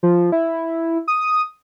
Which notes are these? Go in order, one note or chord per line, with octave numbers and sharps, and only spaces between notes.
F3
E4
D#6